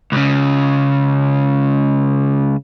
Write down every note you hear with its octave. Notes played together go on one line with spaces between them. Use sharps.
C#2 C#3